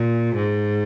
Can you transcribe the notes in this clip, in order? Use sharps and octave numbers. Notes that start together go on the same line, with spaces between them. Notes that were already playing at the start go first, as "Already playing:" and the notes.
Already playing: A#2
G#2